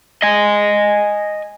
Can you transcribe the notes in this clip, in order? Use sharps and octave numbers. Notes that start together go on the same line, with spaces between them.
D#5 G#5